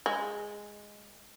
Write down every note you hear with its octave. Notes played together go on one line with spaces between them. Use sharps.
G#3